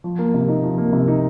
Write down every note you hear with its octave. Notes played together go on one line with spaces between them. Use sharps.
F3
A#3
C3
D#4
F3
A#3
C3
D#4